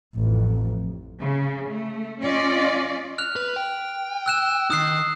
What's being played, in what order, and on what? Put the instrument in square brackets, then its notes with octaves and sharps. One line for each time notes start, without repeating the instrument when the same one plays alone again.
[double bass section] A1 F2
[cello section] C#3
A3
C#4 F4 D5 D#5
[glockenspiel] F6 F#6 F7
[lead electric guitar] B4
G5
[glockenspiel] E6 F#6 E7
[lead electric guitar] D#3 D#4 [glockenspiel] D#6 F#6 C7